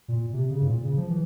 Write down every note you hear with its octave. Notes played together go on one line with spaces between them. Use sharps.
A#2
C3
C#3
G#2
A#2
C#3
F3
E3